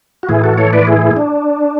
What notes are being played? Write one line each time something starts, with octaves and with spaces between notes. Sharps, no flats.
F#4
A2 E3 E4 G#4
F#4 A4
A4 C#5
B4 D5
E4 G#4
D4